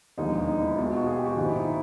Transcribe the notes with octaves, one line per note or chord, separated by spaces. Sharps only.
E1 D#2 D3 F3 G#3 D#4
D#4
E4
B1 B2 G#3 F4
F4
F#4
G#4
G4
F#4
A#1 G#2 D#3 F4
E4
D#4
E4